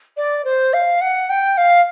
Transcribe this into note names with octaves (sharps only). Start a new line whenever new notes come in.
D5
C5
F5
F#5
G5
F5